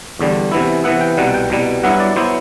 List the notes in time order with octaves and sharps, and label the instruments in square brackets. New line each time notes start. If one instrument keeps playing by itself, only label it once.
[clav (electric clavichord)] E2 D3 G3
C3 E3 B3 E4
C3 E3 B3 E4 F#5
G5
C2 B2 G3 F#5
G5
C2 B2 G3
G2 F#3 B3 E4 F#5
D5
F#3 B3 E4 C5